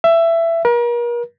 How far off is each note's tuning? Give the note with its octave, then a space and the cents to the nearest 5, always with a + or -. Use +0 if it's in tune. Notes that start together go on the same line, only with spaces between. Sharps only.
E5 +15
A#4 +40